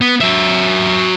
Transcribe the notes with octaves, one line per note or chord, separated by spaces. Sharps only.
B3
F#3 E5